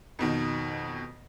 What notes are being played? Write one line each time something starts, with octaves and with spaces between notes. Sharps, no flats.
F2 B2 D#3